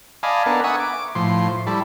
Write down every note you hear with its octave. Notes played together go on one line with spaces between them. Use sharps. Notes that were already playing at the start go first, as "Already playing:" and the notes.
D5 D#5 F5 G#5 A5 B5
B3 D4 A4 A#4
E5 F#5 G#5 C#6 D#6
D6
A2 F3 C6
G3 E4 A4